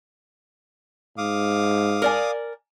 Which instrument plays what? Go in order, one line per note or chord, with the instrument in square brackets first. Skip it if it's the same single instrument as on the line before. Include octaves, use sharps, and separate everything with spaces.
[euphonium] G#2 [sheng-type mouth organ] F5 D6 D#6
[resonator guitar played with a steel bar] A#4 D5 G#5